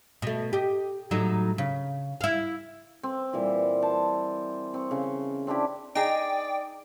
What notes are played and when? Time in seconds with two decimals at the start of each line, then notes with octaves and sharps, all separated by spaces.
0.22 B2 A3
0.53 G4 D#5
1.11 A2 F#3 D#4
1.58 C#3
2.21 E4 F5
3.03 C4
3.33 A#2 E3 G3
3.82 C5 A5
4.74 C4 C#6
4.91 C#3
5.47 C4 D4 E4 G4
5.95 D#4 G#4 D5 G5